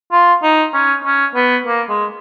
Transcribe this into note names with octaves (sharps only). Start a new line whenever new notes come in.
F4
D#4
C#4
C#4
B3
A#3
G#3